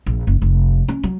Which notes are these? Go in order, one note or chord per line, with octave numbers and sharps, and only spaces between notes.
A#1
F#1
F1
C#4
F#3